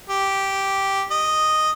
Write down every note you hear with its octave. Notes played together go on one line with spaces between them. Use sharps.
G4
D#5